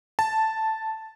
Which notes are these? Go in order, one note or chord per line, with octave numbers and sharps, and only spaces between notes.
A5